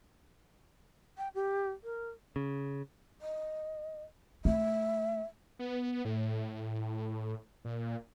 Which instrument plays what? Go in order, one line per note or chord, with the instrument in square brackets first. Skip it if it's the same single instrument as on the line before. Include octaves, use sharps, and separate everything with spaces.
[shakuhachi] G5
G4
A#4
[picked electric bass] C#3
[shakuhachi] D#5
[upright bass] A3 [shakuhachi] E5
[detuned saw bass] B3
A2
A#2